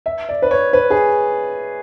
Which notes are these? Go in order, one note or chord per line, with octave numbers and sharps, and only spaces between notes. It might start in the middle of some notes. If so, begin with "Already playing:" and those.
E5
D5
B4
C#5
B4
G#4